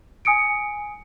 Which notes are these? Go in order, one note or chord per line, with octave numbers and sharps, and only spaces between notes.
G#5 D#6 C#7 D7